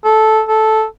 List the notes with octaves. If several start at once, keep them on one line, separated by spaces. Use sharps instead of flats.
A4
A4